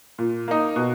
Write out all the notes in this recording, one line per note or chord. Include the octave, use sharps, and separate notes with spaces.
A#2
A#3 D#4
B2